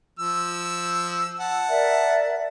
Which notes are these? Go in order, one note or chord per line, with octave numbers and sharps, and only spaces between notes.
F3 E6
F#5 A5
A#4 D5 E5